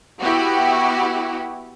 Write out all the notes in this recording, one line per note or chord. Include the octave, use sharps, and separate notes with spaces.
B3 E4 F#4 G4